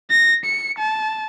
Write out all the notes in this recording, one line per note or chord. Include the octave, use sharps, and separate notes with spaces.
A#6
C#7
A5